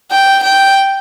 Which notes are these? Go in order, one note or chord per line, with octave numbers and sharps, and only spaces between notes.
G5
G5